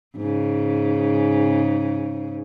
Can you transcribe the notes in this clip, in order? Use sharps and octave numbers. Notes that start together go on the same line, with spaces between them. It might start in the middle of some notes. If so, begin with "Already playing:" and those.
G#2 C#3